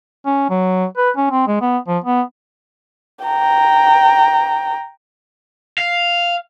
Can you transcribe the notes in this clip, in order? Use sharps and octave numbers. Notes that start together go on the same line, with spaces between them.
C#4
F#3
B4
C#4
C4
G#3
B3
F3
B3
G5 A#5
F5